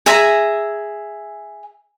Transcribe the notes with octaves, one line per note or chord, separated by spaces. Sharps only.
G#4 E5 G#5 A#5